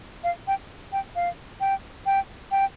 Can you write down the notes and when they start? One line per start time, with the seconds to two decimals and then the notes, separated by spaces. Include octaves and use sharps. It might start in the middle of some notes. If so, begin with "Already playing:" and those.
0.24 F5
0.47 G5
0.92 G5
1.16 F5
1.61 G5
2.06 G5
2.51 G5